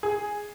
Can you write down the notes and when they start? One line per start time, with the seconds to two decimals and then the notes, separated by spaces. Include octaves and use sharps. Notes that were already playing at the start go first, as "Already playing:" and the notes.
0.03 G#4